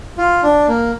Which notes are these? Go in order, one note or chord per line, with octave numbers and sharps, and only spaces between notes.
F4
D4
A#3